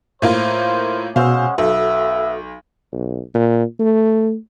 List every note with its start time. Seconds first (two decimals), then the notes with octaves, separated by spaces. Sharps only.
0.22 A2 A#3 F4 C5
1.16 B2 G#3 C#4 F#4 C5 F5 F#5 E6
1.58 B1 B3 F#4 A4 E5
2.93 B1
3.34 A#2
3.79 A3